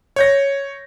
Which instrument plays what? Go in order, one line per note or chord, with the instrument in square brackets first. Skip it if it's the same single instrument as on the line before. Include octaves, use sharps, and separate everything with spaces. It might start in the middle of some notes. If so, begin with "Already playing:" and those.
[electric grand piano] C#5 G6 A#6